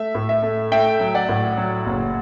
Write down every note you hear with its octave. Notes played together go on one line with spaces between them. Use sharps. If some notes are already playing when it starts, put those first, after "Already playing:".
Already playing: A3 E5
A2
E5
A3
A3 E5 G5
F#3
D5 F#5
A2
F#3
F#1